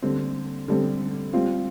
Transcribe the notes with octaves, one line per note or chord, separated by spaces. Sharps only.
D3 G3 C4
D3 G3 C4
G3 C4 F4